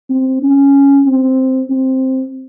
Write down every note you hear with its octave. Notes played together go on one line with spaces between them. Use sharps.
C4
C#4
C4
C4